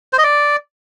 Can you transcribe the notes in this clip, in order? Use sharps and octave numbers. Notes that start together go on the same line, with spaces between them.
C5
D#5
D5